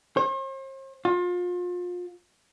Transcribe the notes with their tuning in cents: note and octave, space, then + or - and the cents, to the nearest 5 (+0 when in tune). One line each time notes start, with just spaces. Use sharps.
C5 +45
F4 +30